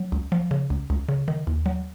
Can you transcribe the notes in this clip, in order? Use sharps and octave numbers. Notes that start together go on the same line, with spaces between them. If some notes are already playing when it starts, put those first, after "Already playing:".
Already playing: F#3
C#2
F3
C#3
C#2
C#2
C#3
D#3
D#2
F#3